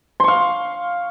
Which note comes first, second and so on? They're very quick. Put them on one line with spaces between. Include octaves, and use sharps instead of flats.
C6 C#6 F5